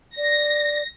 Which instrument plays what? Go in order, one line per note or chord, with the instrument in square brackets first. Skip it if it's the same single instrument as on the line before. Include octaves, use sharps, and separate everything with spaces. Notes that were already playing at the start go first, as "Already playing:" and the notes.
[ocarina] D5 [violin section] A#6